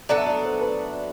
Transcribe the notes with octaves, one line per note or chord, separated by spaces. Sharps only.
F#3 B3 D4 A4 D5
E5
D5
C5
B4